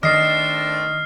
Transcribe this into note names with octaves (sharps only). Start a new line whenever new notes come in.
D#3 A3 C4 D4 D#5 F6 C7